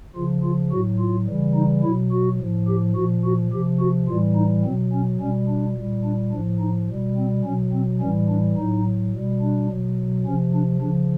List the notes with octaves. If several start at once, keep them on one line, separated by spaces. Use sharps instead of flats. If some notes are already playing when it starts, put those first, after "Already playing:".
C#3 F3 F4
F4
A2 F#3 F#4
F4
C#3 E3 G3
D#4
B2 F#3 E4
F#4
A2 F3
G4
A#2 F3 F#4
F#4
C3 F3 G4
F#4
A2 E3 G3 F4
D#4
B2 F#3 C4
C#4
B2 G3 C#4
D4
A#2 G3
D4
A2 F3 D4
D#4
B2 G3
C4
B2 F#3 C#4
C4
A2 E3 G3 C#4
D4
A2 F#3 D#4
B2 G3
D4
B2 F#3
C3 F3 C#4
D4
C#3 F3 D4